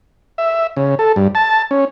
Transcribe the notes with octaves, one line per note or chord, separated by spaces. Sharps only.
E5
C#3
A4
G2
A5
C#4